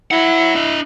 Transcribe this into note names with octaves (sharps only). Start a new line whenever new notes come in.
E4 C#5 F#5
D4 D#5